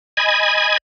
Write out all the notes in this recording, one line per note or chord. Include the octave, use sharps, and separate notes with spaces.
D#5 G#5 B5 G#6